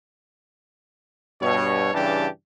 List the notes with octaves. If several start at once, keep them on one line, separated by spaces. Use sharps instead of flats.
G2 B2 C#5
G2 C#3 E3 D4 G4 A5